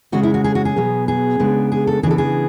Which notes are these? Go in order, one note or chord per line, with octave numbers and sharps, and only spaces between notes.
C#3 G#3 C#4 F#4
E4
F#4
G#4
F#4
G#4
B2 F#3 B3
G#4
C#3 G#3 B3 D4
G#4
A4
C#3 E3 B3 D4 G#4
A4
G#4